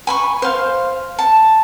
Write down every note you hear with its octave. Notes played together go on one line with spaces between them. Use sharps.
G#5 B5 C#6
C5 F5
A5